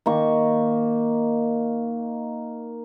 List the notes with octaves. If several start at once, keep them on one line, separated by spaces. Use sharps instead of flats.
D#3 A#3 C#6